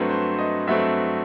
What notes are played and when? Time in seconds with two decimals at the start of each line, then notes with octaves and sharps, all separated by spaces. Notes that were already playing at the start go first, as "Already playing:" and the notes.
Already playing: G2 F#3 A3 C4 B4
0.10 C5
0.38 D#5
0.67 G2 F#3 A3 C4 E5